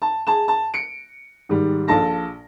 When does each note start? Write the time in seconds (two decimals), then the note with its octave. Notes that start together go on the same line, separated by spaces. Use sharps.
0.02 A5
0.27 G#4 A5 E7
0.48 A5
0.74 C#7 D7
1.49 G#2 D#3 G3
1.88 A#1 F4 A4 A5 A#6